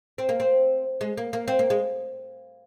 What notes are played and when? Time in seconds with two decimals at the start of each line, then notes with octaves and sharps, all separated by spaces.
0.18 C4
0.29 A#3
0.40 C4
1.01 G#3
1.18 A#3
1.33 A#3
1.48 C4
1.59 A#3
1.70 G#3